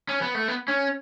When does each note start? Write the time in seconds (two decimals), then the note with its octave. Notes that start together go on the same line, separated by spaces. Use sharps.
0.09 C#4
0.22 B3
0.35 A3
0.48 B3
0.68 C#4